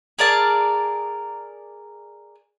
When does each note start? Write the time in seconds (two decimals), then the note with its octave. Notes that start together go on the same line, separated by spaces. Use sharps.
0.19 G#4 A#4 D5 A5